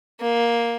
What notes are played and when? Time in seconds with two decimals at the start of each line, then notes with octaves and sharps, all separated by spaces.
0.21 A#3